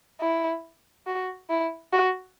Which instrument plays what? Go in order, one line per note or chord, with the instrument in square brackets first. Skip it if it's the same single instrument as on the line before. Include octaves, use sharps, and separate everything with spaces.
[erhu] E4
F#4
E4
F#4